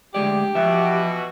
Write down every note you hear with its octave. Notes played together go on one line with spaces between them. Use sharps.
D2 G#3 G4 D5
B2 E3 F3 F#4 E5